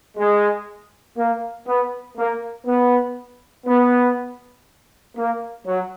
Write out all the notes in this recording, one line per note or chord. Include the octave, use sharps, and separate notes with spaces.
G#3
A#3
B3
A#3
B3
B3
A#3
F#3